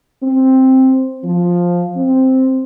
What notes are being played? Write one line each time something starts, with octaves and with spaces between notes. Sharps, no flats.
C4
F3
C4